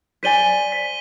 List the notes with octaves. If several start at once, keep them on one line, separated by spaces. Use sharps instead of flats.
C5 D5 G#5 B6 D#7 G7
B6